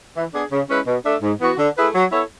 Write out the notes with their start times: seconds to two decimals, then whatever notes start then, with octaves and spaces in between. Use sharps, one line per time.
0.16 E3
0.34 B3 D4 G#4
0.52 C#3
0.69 G#3 C#4 E4 B4
0.87 B2
1.05 A3 D4 A4 E5
1.23 G#2
1.42 E3 B3 F#4
1.59 D3
1.77 A3 E4 G#4 B4
1.95 F#3
2.12 B3 E4 A4 C#5